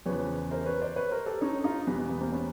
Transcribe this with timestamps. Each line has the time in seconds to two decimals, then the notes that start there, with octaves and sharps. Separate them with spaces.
0.06 E2 C#3 F3 B4 C#5
0.51 A#4 C5
0.61 C5
0.66 B4 C#5
0.81 C5 D5
0.96 B4 C#5
1.11 A#4 C5
1.26 G4 A4
1.41 C#4 D#4
1.64 D#4 F4
1.87 E2 B2 G3 B3
1.98 B3
2.09 B3
2.21 A#3 C4
2.32 B3 C#4